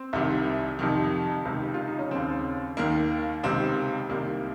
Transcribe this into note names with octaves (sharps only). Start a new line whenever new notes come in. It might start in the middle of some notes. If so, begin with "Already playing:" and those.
Already playing: C4
C2 C3 D#3
F2 C3 D#3
C#2 C3 D#3
F4
D#4
C#4
D#2 C#3 C4
D#2 D#3 A#3
C#2 C3 D#3 C4
C2 C3 D#3 A#3